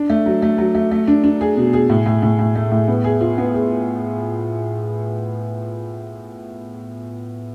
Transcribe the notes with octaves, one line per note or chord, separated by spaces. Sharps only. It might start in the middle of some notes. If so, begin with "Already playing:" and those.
Already playing: D4
A3
F#3
A3
F#3
A3
A3
D4
D4
G#4
B2
G#4
A2
A2
A2
A2
A3
A2
B3
G#4
F4
B3
G#4